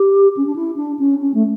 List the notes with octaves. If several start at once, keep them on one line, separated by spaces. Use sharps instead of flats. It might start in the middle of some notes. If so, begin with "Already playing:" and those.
Already playing: G4
C#4
D4
E4
D4
C#4
C#4
A3